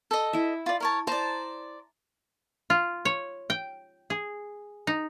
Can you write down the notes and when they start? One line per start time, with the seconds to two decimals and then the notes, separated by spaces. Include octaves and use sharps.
0.11 A4 D#5
0.33 E4 E5
0.66 F4 D5
0.80 A#4 C#5 A5
1.07 C5 D5 A5 A#5
2.70 F4
3.05 C#5
3.50 G5
4.10 G#4
4.87 D#4